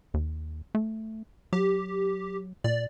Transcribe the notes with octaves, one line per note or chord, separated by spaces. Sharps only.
D#2
A3
F#3 G4
A#2 D5